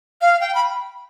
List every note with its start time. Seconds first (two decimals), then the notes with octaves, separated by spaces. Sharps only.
0.21 F5
0.41 G5
0.55 B5